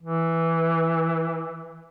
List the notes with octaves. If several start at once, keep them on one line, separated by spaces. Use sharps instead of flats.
E3